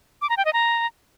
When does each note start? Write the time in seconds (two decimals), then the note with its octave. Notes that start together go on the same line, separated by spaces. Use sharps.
0.22 D6
0.29 A#5
0.37 G5
0.45 D#5
0.53 A#5